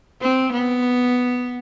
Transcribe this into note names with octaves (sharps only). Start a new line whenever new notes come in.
C4
B3